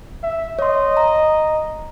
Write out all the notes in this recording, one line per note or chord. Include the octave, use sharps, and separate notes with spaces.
E5
C#5 D#5 C6
A#5